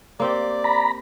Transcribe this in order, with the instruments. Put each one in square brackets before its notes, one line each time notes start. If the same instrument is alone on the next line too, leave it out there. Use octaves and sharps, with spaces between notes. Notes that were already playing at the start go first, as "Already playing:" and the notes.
[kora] A#3 C4 G4 [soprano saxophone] D5
[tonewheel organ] A#5 B5